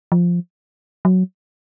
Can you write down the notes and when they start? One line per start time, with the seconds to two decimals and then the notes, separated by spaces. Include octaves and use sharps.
0.12 F3
1.05 F#3